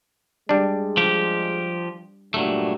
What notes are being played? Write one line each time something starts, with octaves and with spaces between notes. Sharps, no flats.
G3 G#3 D4
F3 G4
G2 A#2 F#3 A3